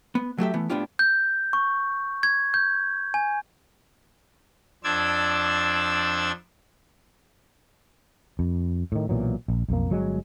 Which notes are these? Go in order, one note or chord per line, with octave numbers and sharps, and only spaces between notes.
B3
F#3 A3 G4 E5
E3 A3 B3
A2 B3 D4 F4 G4
G6
C#6
G#6
G6
G#5
F2 D4 C5 D5 E6 G#6
F2
A2 D#3
B1 A#2 E3 F#3
A#1
B1 F2 A#3
G1 F#3 G#3